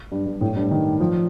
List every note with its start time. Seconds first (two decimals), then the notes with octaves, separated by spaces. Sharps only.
0.12 G2
0.26 G2
0.41 A2
0.56 G2
0.71 D#3
1.00 F3